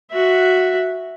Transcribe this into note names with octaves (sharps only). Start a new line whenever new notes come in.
F#4 E5